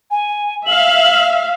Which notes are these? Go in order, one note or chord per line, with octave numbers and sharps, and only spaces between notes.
G#5
E5 F5 F#7